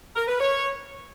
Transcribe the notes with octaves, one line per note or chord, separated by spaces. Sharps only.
A#4
B4
C#5